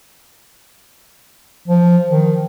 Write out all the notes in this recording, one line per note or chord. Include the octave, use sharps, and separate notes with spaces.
F3
D#3